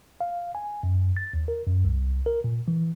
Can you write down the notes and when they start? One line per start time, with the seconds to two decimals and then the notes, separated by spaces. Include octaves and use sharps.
0.21 F5
0.55 G#5
0.83 F#2
1.17 A6
1.34 D#2
1.48 A#4
1.66 F#2
1.85 C2
2.26 A#4
2.44 A#2
2.68 E3